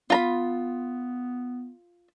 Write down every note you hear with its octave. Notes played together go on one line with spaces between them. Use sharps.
B3 F4 A#5 B5